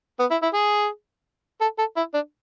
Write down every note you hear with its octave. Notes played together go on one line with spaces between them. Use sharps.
B3
E4
E4
G#4
A4
A4
E4
D4